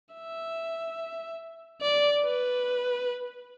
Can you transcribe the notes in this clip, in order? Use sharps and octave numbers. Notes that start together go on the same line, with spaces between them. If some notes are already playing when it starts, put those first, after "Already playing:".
E5
D5
B4